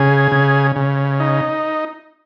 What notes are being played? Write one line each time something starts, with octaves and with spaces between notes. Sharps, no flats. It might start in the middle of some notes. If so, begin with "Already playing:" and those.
Already playing: C#3 G#4
C#3
C#3
D#4